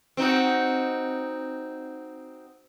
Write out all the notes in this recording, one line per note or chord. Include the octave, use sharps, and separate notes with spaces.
C4 D#4 F#4